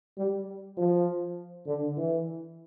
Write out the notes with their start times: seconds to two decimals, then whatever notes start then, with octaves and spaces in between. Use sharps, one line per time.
0.17 G3
0.78 F3
1.67 D3
1.97 E3